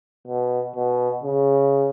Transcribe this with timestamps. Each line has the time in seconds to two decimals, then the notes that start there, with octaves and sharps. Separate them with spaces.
0.27 B2
0.76 B2
1.23 C#3